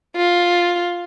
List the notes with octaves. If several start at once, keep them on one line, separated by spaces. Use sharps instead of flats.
F4